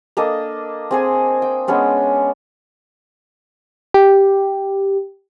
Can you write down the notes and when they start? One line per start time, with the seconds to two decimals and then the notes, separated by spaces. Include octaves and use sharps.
0.17 A#3 D4 A4 D#5
0.91 C4 G#4 C5 G#5
1.42 G5
1.68 G#3 B3 C#4 D4
3.94 G4